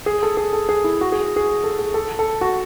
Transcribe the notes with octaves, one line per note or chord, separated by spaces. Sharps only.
G#4
A4
G#4
A4
G#4
E4
F#4
G#4
G#4
A4
G#4
A4
A4
F#4